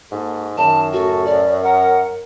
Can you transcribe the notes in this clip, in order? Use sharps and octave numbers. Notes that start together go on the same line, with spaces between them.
G#2 A#3 F#4 A4
F#2 D#3 A5
A2 C#3 F#4 A4
D5
A#4 F#5